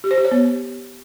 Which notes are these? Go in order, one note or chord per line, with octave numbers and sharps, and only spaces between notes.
G4
C5
G4
C#5
B3